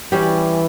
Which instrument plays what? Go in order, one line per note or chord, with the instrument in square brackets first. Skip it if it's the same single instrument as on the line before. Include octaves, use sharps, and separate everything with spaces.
[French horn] E3 [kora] G3 C#4 G4 D5